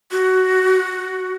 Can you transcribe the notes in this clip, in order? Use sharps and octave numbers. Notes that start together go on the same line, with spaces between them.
F#4